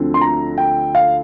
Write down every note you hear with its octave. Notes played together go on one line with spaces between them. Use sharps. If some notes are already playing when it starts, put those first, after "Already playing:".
Already playing: D2 D3 F3 C4
C6
A#5
G5
F5